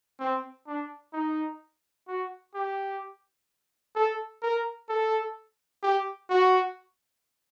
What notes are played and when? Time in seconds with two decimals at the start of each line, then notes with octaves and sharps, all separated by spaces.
0.20 C4
0.67 D4
1.13 D#4
2.08 F#4
2.55 G4
3.96 A4
4.42 A#4
4.89 A4
5.83 G4
6.30 F#4